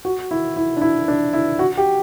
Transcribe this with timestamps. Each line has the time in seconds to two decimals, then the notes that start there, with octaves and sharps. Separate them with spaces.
0.05 F#4
0.31 E4
0.56 E4
0.77 D4
0.81 E4
1.08 D4
1.33 E4
1.59 F#4
1.77 G4